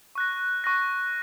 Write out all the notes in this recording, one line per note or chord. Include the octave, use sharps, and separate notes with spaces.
C#6 F#6 A#6
C#6 F#6 A#6